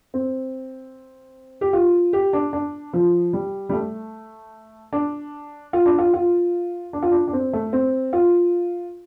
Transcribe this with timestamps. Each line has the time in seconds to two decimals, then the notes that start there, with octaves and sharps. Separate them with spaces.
0.14 C4
1.61 G4
1.73 F4
2.13 G4
2.33 D4
2.53 D4
2.93 F3
3.33 G3
3.69 G3
3.73 A3
4.93 D4
5.73 F4
5.86 D4
5.98 F4
6.13 F4
6.93 D4
7.02 F4
7.11 D4
7.28 D4
7.33 C4
7.53 A3
7.73 C4
8.13 F4